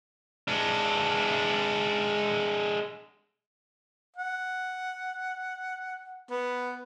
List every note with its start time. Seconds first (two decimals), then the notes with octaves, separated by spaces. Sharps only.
0.48 G#3 D4
4.16 F#5
6.30 B3